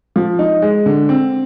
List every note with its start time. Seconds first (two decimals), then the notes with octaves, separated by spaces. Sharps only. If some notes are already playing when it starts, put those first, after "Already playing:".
0.16 F3
0.39 D#4
0.62 G#3
0.86 D3
1.09 C4